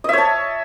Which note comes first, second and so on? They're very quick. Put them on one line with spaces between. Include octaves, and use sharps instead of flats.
D#5 E5 C#5 A5